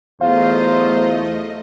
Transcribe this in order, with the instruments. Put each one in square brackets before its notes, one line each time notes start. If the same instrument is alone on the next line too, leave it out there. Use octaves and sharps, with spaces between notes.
[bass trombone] E2 [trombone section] F#3 F4 C5 [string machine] A3 D#5 [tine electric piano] F5